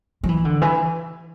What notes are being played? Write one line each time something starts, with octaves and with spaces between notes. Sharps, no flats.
F3
E3
D3
E3